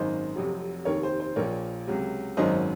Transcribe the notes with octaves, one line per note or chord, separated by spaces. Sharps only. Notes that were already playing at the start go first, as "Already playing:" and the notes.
Already playing: G#1 F#2 D#3 C5 D#5
F1 F2 C3 F#3
F1 D#2 D#3 A#4 C#5
C5
C5
A#1 A#2 F3 A#4 C#5
C#2 C3 F#3
G#1 F#2 D#3 F#3 C5 D#5